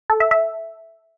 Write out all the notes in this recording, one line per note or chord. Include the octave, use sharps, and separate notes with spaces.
A4
E5
E5